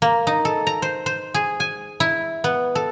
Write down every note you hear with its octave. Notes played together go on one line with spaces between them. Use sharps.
A#3
D#4
A4
A#5
C5
C5
G#4
G#5
E4
B3
A4